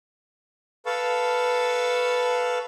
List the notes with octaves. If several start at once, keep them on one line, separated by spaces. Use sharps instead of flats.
A4 B4 F5 A5 C#6